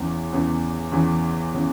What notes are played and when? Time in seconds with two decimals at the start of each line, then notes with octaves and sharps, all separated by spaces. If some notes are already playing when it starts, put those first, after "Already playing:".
Already playing: E2 C#3 E3 B3
0.32 E2 C#3 E3 B3
0.92 E2 C#3 E3 B3
1.53 C#3 E3 B3